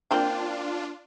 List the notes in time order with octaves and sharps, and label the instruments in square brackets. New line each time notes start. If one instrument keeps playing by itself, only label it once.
[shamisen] A#3 C4 F5 [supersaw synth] D4 F4